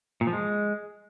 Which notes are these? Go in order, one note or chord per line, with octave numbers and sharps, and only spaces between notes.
A#2
F3
G#3